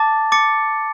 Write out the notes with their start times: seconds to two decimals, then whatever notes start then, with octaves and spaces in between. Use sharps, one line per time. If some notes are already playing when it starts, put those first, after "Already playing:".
Already playing: A5 D6 A6
0.32 D6 A6 C#7